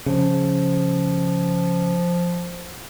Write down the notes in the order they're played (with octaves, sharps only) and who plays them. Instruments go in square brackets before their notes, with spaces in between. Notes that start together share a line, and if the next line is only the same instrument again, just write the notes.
[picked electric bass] C#3 [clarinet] F3